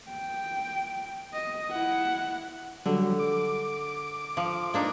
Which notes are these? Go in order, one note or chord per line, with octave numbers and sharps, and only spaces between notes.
G5
D#5
E4 F#5
D3 F#3 G3
D6
F3
A#3 D4 D#4